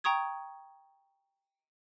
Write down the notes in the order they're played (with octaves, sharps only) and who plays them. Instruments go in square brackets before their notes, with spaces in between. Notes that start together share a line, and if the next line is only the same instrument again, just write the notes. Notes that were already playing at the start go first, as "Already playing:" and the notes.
[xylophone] G5 A#5 C#6 D#6 G#6